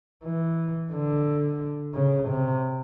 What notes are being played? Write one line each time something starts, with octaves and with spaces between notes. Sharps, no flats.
E3
D3
C#3
C3